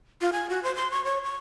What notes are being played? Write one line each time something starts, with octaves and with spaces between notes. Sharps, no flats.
F4
G#5
F#4
C5
C6
C#6
C#5
C#6